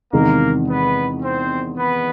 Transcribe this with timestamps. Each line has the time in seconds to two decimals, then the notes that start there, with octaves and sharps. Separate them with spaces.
0.13 E2 C3 D#3 G#3 A#3 A#4
0.68 B3 B4
1.23 C4 C5
1.78 B3 B4